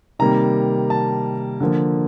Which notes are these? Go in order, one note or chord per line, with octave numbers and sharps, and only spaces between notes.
C3 D#3 G3 A#3 A#5
A5
D3 F3 A#3